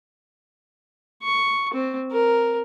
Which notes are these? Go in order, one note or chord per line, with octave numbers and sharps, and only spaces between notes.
C#6
C4
A#4